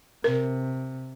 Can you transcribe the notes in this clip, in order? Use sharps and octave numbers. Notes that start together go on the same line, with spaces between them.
C3 A#4